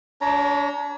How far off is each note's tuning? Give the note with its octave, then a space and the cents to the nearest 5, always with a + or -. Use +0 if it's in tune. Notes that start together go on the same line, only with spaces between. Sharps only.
D4 -35 C#5 +15 A#5 +0